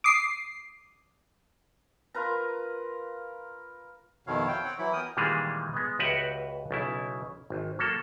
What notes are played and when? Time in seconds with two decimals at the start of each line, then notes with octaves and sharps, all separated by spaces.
0.04 D6 D#6 C7
2.14 F4 A#4 B4 A#5
4.27 F2 B2 D#3 E4 C#5 F5
4.48 G5
4.64 C4 C#5 F#5
4.79 E3 F#3 E4 B5
4.93 B3 A#4 G5 D#6
5.17 A#2 D#3 E3 G3 G#3 G#4
5.74 G#3 B3
5.99 C#2 F#4 G4 B4 E5 F#5
6.71 B1 C#3 E4
7.50 G#1
7.79 F#3 A#3 A4